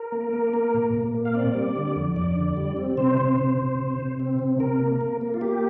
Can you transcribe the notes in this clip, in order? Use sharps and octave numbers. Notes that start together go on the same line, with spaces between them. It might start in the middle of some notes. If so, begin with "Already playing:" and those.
Already playing: A#4
A#3
A#3
A#3
A#2
A#2
A#3
F5
C4 D5
G3
D3
F2
F2 D5
D3
G3
C4
C3 C5
C3
C3
C3
C3
C3
C4
C3
C3 A#4
A#3
A#3
A#3
F4
A#3 G4